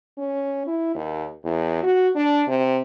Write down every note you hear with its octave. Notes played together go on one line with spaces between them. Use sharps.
C#4
E4
D#2
E2
F#4
D4
C3